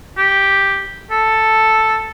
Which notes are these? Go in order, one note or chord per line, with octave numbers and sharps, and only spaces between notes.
G4
A4